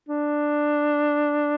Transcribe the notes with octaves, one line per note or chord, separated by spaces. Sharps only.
D4